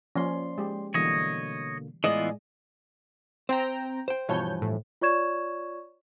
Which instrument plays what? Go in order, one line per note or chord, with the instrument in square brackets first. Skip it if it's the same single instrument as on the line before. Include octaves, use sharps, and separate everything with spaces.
[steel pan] F3 A#3 C#4 [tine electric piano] D5 C6
[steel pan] G#3 G4
[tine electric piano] B2 D3 A#3 [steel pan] E3 G3 [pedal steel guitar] C#5 D#5
[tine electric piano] A2 D5 G#5 [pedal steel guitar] E3 B3 F4 [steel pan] G#3 [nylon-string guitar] D#5
[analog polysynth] C4 G5 A#5 [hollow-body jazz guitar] C5
[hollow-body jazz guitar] C5 G5
[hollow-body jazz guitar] G2 E3 F3 [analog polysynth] B2 C#5 G6
[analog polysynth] A2
[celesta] F4 C#5 D5 C#6 G#6 E7